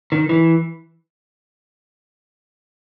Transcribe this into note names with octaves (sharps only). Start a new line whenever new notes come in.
D#3
E3